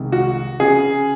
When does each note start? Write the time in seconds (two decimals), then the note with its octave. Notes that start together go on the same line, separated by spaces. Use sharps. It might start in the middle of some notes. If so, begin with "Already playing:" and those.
Already playing: C2 C3 D#3 G#3
0.12 F#4
0.60 C#3 G#4